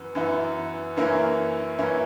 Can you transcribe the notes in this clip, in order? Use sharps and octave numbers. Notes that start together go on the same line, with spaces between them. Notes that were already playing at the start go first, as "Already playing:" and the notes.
Already playing: F#2 E3 B3
F#2 E3 B3 E4
F#2 E3 A#3 C#4 E4
F#2 E3 A#3 C#4 E4